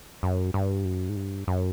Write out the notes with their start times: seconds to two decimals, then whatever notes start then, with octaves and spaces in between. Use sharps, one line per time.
0.23 F#2
0.54 G2
0.85 F#2
1.09 G#2
1.16 G2
1.48 F#2